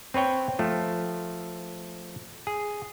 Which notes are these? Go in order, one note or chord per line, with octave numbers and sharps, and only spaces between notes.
C4 B4 C#5 G5
F3 A3
G#4